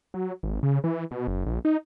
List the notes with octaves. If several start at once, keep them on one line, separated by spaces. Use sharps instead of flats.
F#3
G#1
C#3
E3
B2
F#1
A#1
D#4